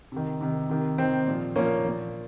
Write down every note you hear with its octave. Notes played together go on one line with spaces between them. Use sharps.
C3 D#3
C3 D#3
C3 D#3
C3 D#3 C4
A#2 F3
A#2 F3 A#3 C#4
A#2 F3